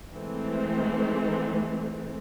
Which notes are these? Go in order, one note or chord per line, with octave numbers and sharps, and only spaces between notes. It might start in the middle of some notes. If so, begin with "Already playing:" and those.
E3 G#3 A3 C4